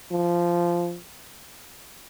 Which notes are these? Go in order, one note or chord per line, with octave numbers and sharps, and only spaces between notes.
F3